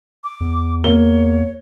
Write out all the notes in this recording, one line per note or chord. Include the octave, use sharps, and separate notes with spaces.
D6
E2
A#3 C#5 G7